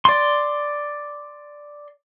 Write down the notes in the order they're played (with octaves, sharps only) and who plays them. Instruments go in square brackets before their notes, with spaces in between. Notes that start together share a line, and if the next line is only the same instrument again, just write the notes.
[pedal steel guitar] D5 C6